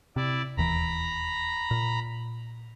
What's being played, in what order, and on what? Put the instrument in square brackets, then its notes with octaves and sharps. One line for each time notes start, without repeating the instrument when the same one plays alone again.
[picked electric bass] C3 [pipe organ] E4 D5
[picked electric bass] E1 D#2 E3 [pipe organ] A#5 B5
[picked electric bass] A#2